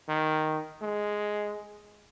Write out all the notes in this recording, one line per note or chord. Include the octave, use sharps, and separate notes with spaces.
D#3
G#3